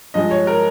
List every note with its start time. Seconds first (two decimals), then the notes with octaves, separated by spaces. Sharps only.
0.14 G2 F3 G#3 D#5
0.31 C#5
0.47 A#4